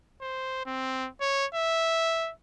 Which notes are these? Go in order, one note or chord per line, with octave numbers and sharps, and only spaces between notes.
C5
C4
C#5
E5